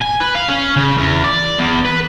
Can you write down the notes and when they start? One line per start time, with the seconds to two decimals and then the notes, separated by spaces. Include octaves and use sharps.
0.02 G#5
0.21 B4
0.35 F5
0.48 C#4
0.76 C#3
0.97 E2
1.24 D5
1.59 E2
1.85 B4